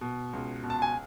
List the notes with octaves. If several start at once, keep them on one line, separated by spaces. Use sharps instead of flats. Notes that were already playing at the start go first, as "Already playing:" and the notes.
B2
C#2
B2
A5
G#5